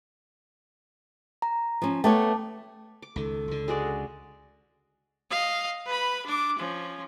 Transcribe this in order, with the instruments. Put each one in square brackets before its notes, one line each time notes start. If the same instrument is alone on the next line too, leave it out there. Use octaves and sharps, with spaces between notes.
[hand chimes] A#5
[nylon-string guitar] F3 C#4
[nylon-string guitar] A3 B3 C#5 [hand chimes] G5 A5 D6
[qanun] D6
[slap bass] C#2 D#3 [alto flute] A4
[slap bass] C#2 D3
[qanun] G#3 F#4 D5
[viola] D#5 F5
B4 B5
D4 D6
F3 C#4